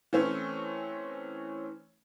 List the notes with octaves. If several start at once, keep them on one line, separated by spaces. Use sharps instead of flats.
E3 A3 C4 C#4